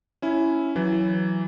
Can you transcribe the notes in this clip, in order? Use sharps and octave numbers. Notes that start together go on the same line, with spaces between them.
C#4 E4
E3 F#3